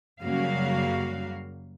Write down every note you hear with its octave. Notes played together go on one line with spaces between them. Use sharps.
F#2 C#3 G3 A#3 F#4 F5